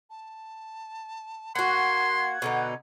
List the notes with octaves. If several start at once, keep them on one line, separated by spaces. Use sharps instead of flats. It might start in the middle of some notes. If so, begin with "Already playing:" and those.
A5
A#3 F#4 F#5 C6 G#6
B2 D3 D#4